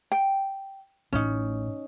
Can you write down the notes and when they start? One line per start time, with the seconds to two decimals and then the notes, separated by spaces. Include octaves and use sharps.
0.12 G5
1.13 A1 A2 C#4 D#4